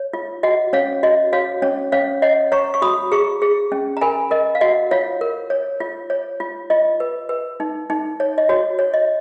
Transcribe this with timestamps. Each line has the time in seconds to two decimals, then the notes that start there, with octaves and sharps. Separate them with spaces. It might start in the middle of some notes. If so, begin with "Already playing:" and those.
Already playing: C#5
0.13 F4
0.43 F#4 D#5 F#5
0.73 C#4 C#5 F5
1.03 F#4 D#5
1.33 F#4 C#5 F5
1.62 C#4 C#5
1.92 C#4 C#5 F5
2.22 C#5 D#5 F#5
2.52 C#5 A#5 C#6
2.74 C#6
2.82 F#4 B5 D#6
3.12 G#4 A#5 C#6
3.42 G#4
3.72 C#4
3.97 A#5
4.01 A#4 G#5 B5
4.31 A#4 D#5
4.55 F5
4.61 F#4 D#5 F#5
4.91 F4 C#5 F5
5.21 A#4
5.50 C#5
5.80 F4
6.10 C#5
6.40 F4
6.70 F4 D#5
7.00 B4
7.29 B4
7.60 D#4
7.90 D#4
8.20 C#5
8.38 D#5
8.49 F#4 C#5
8.79 C#5
8.94 D#5